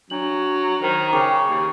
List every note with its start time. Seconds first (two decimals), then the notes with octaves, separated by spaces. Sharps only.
0.10 F#3 D4 F#7
0.82 D#3 C5 A#5
1.13 C#3 G5 C#6 D6
1.48 D#2